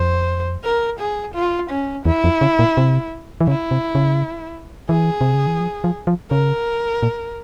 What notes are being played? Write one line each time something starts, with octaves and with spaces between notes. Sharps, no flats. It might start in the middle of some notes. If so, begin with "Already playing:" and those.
Already playing: F2 C5
A#4
G#4
F4
C#4
E2 E4
F2
C#3
A#2
C3
E3
C#3 E4
C3
C#3
E3 G#4
C3
C#3
E3
F3
F3
F3
C#3 A#4
A#2